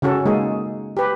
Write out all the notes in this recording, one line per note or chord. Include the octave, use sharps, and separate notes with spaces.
C#3 C#4 F#4 A4
G#3 A#3 D#4 G#4
G4 B4